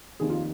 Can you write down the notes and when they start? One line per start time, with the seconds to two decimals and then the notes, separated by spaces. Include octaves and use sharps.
0.20 F1 D#2 D#3 G#4
0.30 F4